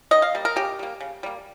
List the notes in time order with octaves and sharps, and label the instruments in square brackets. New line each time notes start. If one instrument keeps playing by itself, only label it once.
[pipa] D#3 D#5
F5
G3 A#3
A#4
C#3 G4
G3 A#3
C#3
G3 A#3